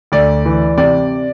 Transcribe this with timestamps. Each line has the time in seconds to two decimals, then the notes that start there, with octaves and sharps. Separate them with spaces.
0.12 D2 D5
0.45 E3
0.77 C3 D5